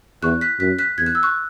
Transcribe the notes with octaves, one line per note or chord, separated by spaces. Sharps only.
E2 C#6 F#6
F#6 B6
F#2 F#6 B6
F#6 B6
E2 G#6
F#6
E6
C#6 F#6